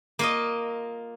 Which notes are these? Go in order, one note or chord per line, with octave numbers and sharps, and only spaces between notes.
A#3 F4 D#5